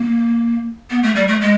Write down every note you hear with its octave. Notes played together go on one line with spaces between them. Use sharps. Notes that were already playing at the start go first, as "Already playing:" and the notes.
Already playing: A#3
B3
A3
G3
A3
G#3